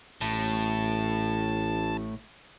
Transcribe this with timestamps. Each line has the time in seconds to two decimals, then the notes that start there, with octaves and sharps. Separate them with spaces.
0.21 A1 A2 A5